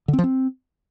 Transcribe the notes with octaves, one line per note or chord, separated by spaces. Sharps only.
D3
C4
F3
C4